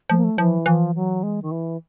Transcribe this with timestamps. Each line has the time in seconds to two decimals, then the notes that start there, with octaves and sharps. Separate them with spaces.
0.10 F3 A3
0.17 A#3
0.24 A3
0.38 E3 F3
0.66 E3 F3
0.95 F#3
1.23 G#3
1.42 D#3
1.51 E3